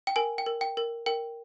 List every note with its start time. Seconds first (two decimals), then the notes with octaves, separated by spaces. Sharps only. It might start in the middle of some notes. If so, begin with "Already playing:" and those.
0.07 G5
0.16 A#4 G#5
0.38 G5
0.46 A#4
0.61 G5
0.77 A#4
1.06 A#4 G5